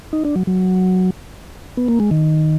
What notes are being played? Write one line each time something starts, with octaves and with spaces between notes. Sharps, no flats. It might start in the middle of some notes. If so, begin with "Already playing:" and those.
D#4
D4
F#3
F#3
B3
A#3
G#3
D#3